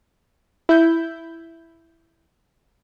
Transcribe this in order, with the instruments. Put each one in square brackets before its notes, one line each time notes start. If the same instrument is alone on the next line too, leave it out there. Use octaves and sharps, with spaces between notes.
[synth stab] E4 G6